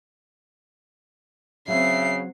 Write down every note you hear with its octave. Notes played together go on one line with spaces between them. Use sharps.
C#3 F#3 C4 E5 C7